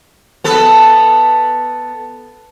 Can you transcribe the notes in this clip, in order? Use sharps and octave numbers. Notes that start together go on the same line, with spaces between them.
B3 A4 B4